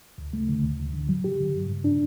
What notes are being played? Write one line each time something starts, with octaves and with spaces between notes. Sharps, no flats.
D2
A3
D3
D2
D2
D3
F#3
G4
D3
G2
G2
D4